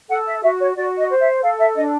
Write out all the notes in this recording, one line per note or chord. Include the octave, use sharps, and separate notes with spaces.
A4 F#5
E5
F#4 E5
C#5
F#4 D5
D#5
C5
E5
A4 F5
E5
D4 D#5